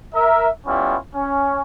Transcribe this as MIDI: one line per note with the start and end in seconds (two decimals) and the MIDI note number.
0.14 0.49 70
0.14 0.49 76
0.67 0.97 55
0.67 0.97 59
0.67 0.97 61
0.67 0.97 64
0.67 0.97 65
1.15 1.61 61